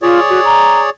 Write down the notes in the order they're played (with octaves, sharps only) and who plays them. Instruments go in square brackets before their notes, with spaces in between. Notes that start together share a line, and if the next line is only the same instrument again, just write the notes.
[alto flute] F4 [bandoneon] G#4 C#5 D5
[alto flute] F#4
A#5